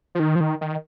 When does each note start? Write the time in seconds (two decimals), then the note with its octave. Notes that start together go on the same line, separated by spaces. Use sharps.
0.15 F3
0.20 D#3
0.36 F3
0.40 D#3
0.61 D#3